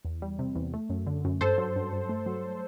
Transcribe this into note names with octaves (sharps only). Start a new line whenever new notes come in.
E2
G3
C3
E2
A3
F#2
D3
F#2
G2 A4 C5
F#3
G2
G2
A3
F#3